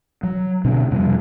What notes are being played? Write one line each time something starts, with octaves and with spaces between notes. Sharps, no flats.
F#3
B2 D3 C4
F2 C3 G3